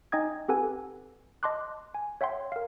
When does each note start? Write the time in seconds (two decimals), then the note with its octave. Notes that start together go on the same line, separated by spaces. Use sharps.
0.12 D#4 D#5 G5 G#5 D#6 G#6
0.48 C4 G4 A4 B4 F#5 G#5
1.43 D#5 A5 C6 D6 F#6
1.95 G#5
2.21 C#5 E5 F#5 G5 C6
2.52 A#4 F5